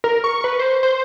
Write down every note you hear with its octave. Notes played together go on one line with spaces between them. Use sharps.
A#4
C#6
B4
C5
C5